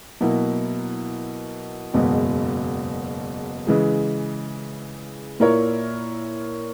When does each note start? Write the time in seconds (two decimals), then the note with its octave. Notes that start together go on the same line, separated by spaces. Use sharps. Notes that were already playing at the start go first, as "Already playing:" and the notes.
0.21 B2 F#3 A#3 E4
1.93 F#1 E2 B2 G#3
3.67 C#3 E3 G#3
5.40 A#2 A#3 E4 A#4 C#5